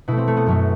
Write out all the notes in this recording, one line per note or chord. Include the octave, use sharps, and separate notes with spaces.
B2 A3 E4
C4
A3
B3
F#2 F#3 A3